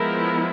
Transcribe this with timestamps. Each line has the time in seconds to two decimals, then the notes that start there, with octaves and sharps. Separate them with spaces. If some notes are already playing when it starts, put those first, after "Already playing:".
Already playing: F3 G#3 B3 E4 A#4